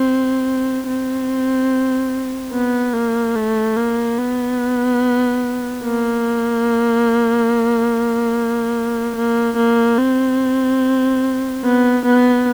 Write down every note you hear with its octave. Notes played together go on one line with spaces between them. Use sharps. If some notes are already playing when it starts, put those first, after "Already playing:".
Already playing: C4
C4
B3
A#3
A3
A#3
B3
A#3
A#3
A#3
C4
B3
B3